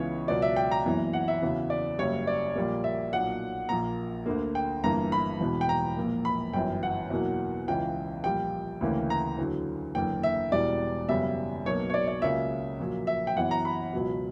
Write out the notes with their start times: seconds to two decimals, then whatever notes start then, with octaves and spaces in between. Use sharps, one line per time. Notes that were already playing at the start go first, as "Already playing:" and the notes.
Already playing: C#2 C#3 E3 B3 C#5
0.28 C#2 B2 F#3 D5
0.42 E5
0.56 G5
0.71 A#5
0.86 F#1 F#2 E3 B3
1.13 F#5
1.28 E5
1.42 E2 C#3 F#3 B3
1.70 D5
1.98 F#1 F#2 C#3 G3 C#5
2.27 D5
2.55 A#1 A#2 G3 A#3
2.84 E5
3.13 B1 A#2 F#3 F#5
3.69 A#1 A#2 A#3 A#5
4.26 D2 D3 A#3
4.55 G5
4.83 G1 G2 E3 A#3 A#5
5.12 B5
5.40 E1 E2 B2
5.61 G5
5.69 A#5
5.97 A#1 A#2 A#3
6.25 B5
6.53 G1 F#2 E3 G5
6.83 F#5
7.10 E2 B2 F#3 A#3
7.68 C#2 C#3 E3 G5
8.24 A#1 A#2 G3 G5
8.81 D2 C#3 E3 A#3
9.10 A#5
9.38 E2 D3 F#3
9.95 F#1 E2 D3 A#3 G5
10.23 E5
10.52 E1 E2 B2 G3 D5
11.09 F#2 C#3 G3 B3 E5
11.65 B1 B2 F#3 A#3 C#5
11.90 C#5
11.94 D5
12.08 D5
12.22 C#2 C#3 F#3 A#3 E5
12.79 A#1 A#2 F#3 A#3
13.07 E5
13.27 G5
13.36 F#2 E3 B3 F#5
13.51 A#5
13.65 B5
13.93 C#2 B2 F#3